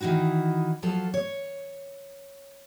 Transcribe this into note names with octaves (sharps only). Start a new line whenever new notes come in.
D#3 E3 D#4 E4 F#4
F3 F#3 F4 A4
C#5